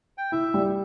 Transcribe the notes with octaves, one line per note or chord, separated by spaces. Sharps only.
G5
E4 E5
G3